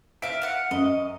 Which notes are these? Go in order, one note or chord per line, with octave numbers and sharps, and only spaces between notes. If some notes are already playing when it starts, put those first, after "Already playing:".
E5 F5 D7
F5 F#5
F#2 D#5